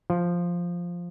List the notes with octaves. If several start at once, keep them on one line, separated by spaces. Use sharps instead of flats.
F3